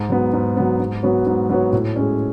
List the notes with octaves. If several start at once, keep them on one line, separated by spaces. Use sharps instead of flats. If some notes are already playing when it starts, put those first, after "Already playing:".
Already playing: G#2
F#3 B3
G#2
F#3 B3
G#2
F#3 B3 F#4 C#5
G#2
F#3 B3 F#4 C#5
A2
G#3 C#4